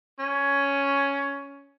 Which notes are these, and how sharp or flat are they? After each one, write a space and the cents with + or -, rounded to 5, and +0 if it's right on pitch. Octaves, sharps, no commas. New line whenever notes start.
C#4 +10